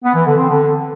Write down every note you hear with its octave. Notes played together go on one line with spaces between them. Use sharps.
B3
E3
D3
C4
D3